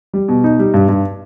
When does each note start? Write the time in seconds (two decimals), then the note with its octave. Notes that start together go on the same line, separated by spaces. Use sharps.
0.14 G3
0.28 B2
0.44 D#4
0.59 G3
0.74 G2
0.89 G2